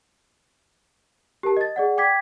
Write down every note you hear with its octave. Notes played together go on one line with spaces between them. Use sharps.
G4 A#4 A5
D#5 A6
G#4 D5 F#5
G5 D6 G#6 B6